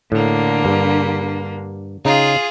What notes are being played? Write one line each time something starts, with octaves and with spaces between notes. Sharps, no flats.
A2 D3 A#3
G2
C#3 D#4 F4 G#4 A#5